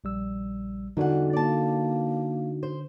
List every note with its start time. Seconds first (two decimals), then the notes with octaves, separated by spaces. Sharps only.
0.04 A#1 G3 E6
0.97 E2 D3 G3 D#4 F#4 F#5
1.33 A#3 D5 A5
2.63 C5